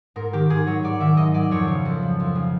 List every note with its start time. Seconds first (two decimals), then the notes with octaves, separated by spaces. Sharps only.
0.16 G#2 A#4
0.33 D#3 G4
0.50 G#2 G#4
0.66 F#3 C#5
0.84 G#2 D5
1.00 D#3 E5
1.17 G#2 D#5
1.34 F#3 D5
1.51 F2 C#5
1.68 C#3
1.85 F2
2.02 F3
2.20 F2
2.35 C#3